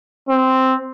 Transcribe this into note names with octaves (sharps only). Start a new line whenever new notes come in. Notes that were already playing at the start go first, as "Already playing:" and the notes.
C4